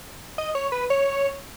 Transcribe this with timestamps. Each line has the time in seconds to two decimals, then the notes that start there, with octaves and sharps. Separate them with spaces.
0.38 D#5
0.55 C#5
0.72 B4
0.90 C#5